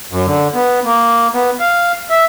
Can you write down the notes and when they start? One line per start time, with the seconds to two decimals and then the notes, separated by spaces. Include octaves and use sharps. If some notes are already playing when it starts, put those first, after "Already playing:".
0.12 F#2
0.26 D3
0.54 B3
0.85 A#3
1.34 B3
1.60 F5
2.10 E5